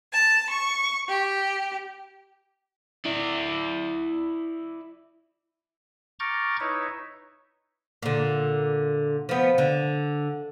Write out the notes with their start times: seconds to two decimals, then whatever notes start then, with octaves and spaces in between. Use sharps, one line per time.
0.12 A5
0.49 C#6
1.07 G4
3.06 E4 D5
6.20 A#5 C#6 D6 F6 G6 A6
6.60 D#4 E4 B4 C#5 E5
8.03 A#2 D3
9.29 F3 B3
9.58 D3